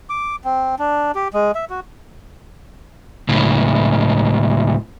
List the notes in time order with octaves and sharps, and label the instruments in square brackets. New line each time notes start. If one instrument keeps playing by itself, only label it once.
[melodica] D6
C4
D4
G4
G#3
E5
F#4
[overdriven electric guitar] C#2 A2